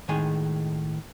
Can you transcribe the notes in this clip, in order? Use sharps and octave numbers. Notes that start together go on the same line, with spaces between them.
A2 D#3 G#3 G#4 G#5